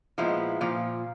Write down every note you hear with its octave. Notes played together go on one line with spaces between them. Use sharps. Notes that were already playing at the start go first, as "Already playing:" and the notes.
A#2 F3 G#3 B3 E4
A#2 F3